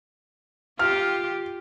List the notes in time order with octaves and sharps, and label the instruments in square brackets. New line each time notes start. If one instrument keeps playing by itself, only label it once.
[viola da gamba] F4 G4 [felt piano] F6